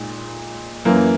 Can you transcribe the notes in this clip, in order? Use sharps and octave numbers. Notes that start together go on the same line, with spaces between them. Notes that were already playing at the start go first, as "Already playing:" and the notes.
Already playing: A#2 G#3 D#4
F#2 E3 A#3